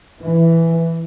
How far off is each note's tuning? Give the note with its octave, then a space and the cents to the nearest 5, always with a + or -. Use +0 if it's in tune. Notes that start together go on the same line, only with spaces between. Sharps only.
E3 +5